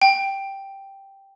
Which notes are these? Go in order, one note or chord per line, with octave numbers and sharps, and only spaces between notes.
G5